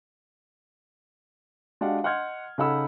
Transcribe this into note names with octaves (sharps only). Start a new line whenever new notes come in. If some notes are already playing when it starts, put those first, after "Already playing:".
G#3 D4 F#4 G4 F5 F#5
D#5 F#5 C6 F6 G6 G#6
C#3 D#4 A4 F#5 B5 E6